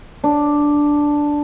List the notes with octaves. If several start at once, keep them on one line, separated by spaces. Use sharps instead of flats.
D4